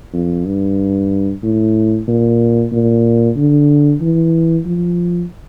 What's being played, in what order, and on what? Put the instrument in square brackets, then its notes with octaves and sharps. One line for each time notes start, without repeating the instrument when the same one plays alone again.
[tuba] F2
G2
A2
A#2
A#2
D3
E3
F3